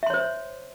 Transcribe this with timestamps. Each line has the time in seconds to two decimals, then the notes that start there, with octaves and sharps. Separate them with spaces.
0.03 E5
0.06 C6
0.10 C#5
0.14 C5